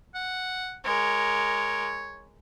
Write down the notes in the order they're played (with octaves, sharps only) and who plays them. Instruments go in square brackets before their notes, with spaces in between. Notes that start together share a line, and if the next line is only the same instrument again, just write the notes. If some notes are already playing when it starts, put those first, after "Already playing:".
[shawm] F#5
[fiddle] G#3 A#4 [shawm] C#5